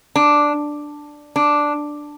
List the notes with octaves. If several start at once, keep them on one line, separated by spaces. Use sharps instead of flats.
D4
D4